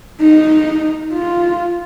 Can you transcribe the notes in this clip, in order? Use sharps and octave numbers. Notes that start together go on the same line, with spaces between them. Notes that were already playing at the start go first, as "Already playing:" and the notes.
D#4
F4